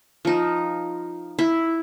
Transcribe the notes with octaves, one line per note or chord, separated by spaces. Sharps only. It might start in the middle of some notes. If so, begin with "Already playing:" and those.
F3 D#4
E4